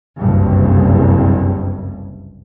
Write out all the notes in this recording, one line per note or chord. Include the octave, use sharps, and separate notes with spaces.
F#1 C2 G2